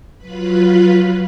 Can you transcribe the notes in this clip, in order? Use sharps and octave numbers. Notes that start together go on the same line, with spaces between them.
F#3 F4 B4 B5